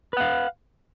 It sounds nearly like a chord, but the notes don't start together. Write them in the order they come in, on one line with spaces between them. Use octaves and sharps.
B4 F#5 F5